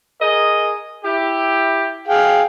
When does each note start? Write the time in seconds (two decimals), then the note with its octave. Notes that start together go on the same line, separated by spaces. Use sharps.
0.20 G#4 A#4 D#5
1.03 E4 G4
2.08 G#4 F5 G5